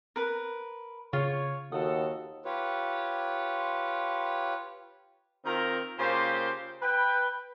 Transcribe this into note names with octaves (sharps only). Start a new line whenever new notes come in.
A#4 B4
C#3 F4 C#5
D#2 F#4 A4 D#6
F4 G4 B4 C#5
D#3 C4 F4 A#4 A#5
C#3 A#3 F4 G4 C5
B4 G5